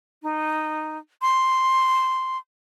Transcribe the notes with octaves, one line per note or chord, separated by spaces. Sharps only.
D#4
C6